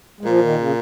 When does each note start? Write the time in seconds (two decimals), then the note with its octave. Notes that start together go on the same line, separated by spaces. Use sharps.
0.21 G#3
0.25 A#2 F3
0.41 D#3
0.57 C#3